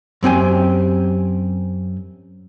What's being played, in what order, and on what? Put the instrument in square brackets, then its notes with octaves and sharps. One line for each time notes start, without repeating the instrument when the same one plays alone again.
[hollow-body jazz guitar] F#2 C4 G4 G#5